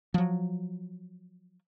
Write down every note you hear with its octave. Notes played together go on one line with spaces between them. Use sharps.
F3 F#3